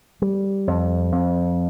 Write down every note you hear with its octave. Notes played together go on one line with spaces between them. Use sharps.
G3
F2
F2